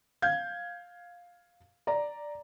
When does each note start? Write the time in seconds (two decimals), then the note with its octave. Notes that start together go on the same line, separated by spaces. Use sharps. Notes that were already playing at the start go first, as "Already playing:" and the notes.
0.22 F5 G6 G#6
1.87 D5 A#5